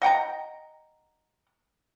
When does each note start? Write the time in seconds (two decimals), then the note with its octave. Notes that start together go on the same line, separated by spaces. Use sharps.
0.02 D#5 F#5 G5 A#5